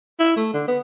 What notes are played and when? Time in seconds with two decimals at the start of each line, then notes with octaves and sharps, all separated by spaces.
0.19 E4
0.36 A3
0.53 D3
0.68 B3